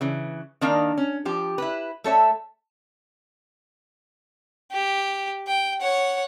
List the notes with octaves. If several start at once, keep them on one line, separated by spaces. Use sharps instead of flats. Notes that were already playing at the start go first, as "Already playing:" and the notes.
C#3 E3
D#3 A#3 D4 D#4 A#4 F5
C#4
F3 G4
E4 B4
A3 A4 C#5 E5
G4
G5
C#5 F#5